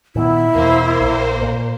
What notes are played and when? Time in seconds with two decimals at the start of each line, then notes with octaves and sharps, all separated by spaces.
0.16 A#2 D#3 B3 E4
0.55 E2 B2 A#3 C5
1.01 A#1
1.42 A#2